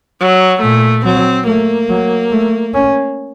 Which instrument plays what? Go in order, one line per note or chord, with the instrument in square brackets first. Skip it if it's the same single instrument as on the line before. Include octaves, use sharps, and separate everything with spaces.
[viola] F#3
[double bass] A#2 [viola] A3
[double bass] F#3 [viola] C4
[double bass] A3 [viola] A#3
[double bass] F#3
A3
C#4